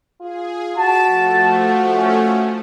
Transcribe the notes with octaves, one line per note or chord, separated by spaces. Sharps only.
F4 G#4
F#4 A5 B6 D7 E7
F3 A3
C#4